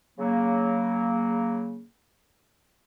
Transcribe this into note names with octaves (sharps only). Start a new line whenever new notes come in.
C#3 F#3 A#3